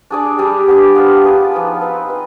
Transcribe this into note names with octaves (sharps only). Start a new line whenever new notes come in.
D4 G#4 D5
G3 D4 G#4
B3 D4 G4 D5
B3 F4 C5
D4 G#4 B4
F3 B3 D#4 B4
C4 D#4 B4
B4 D#5